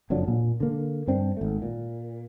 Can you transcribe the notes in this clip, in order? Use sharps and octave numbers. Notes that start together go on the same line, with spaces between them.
F#1 F2 F#3 D4
A#2
D3 A#3
G2 C4 D4
G#1 A3
A#2